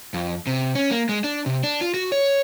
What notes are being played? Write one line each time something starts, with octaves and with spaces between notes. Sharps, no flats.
F2
C3
C#4
A#3
G#3
D4
C3
D4
F4
F#4
C#5